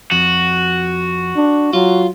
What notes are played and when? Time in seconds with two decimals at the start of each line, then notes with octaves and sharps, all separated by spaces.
0.11 F2 F#4
1.36 D4
1.73 F#3 F4